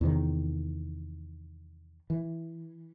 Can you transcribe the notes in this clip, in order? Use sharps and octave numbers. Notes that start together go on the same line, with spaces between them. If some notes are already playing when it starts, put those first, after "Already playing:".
E2 C3 D#3
E3